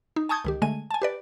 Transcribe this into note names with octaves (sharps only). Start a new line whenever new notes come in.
D#4
G#5 A5 C#6 D#6 G6 G#6
C#2 D#3 G4
D3 G#3 A3 G#5 D#7
G#5 A5
G4 B4 D5